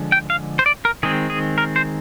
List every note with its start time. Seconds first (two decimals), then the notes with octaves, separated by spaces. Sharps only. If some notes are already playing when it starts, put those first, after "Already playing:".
Already playing: D3 F3 G#3
0.12 G5
0.30 F5
0.59 C5
0.66 D5
0.85 A#4
1.03 D#3 G#3 C4 G#4
1.30 G#4
1.58 A#4
1.76 C5